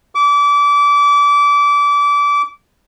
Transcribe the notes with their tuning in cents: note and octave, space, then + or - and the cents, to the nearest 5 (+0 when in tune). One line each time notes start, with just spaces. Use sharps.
D6 -25